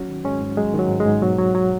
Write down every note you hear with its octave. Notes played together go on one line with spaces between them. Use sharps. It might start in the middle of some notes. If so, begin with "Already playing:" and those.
Already playing: F#3 C#4 F#4
D#3
G#2 G#3 C#4
G#2
F#3 G#3
D#3
F#3
G#2
G#3
G#2
B2 F#3
F#3
F#3